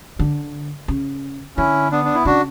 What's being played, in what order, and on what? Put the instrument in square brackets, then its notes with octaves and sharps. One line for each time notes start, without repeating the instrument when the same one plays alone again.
[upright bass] D3
C#3
[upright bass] D3 [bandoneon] C#4 E4
[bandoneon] B3 D4
D4
E4
[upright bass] C#3 [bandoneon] D4 F#4